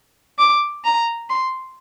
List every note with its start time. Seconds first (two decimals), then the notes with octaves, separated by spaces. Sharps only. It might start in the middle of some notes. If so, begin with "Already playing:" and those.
0.39 D6
0.84 A#5
1.30 C6